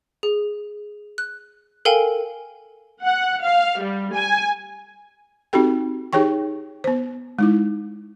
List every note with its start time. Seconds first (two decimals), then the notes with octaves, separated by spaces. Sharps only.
0.23 G#4
1.18 F#6
1.85 A4 A#4 F5 G5 G#5
3.03 F#5
3.42 F5
3.80 G3
4.13 G#5
5.53 C4 D#4 F#4 G4 A4 G5
6.13 D#4 G4 G#4 C#5 G5 C#6
6.84 B3 C5
7.39 G#3 D#4 E4